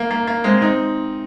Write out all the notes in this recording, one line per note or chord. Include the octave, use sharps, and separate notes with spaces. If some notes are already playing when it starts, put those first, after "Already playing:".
Already playing: A#3
A#3
A#3
G#3 C4
C4 D#4